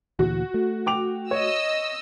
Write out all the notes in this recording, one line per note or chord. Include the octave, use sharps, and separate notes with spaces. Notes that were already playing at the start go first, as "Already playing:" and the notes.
D2 A#2 E3 F#4
A3
G5 D6 F7
C#5 D#5 E6